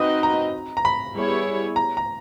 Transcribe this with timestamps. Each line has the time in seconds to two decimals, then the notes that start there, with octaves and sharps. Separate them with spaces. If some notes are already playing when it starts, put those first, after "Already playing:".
Already playing: C4 D#4 F#4 B4 D#5 D#6
0.23 A#5
0.77 A#5
0.85 B5
1.15 G3 B3 E4 G#4 C#5
1.76 A#5
1.97 A#5